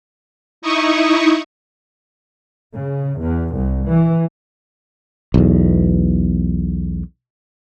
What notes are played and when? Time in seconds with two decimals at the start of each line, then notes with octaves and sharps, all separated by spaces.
0.62 D#4 E4 C#6 D#6
2.74 C#3
3.19 E2
3.54 C2
3.89 E3
5.34 B1 E2